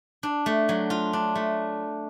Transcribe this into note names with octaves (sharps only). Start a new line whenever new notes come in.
D4
A3
F#3
F4
D4
A3